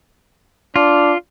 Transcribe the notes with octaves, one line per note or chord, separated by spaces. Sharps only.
D4 F4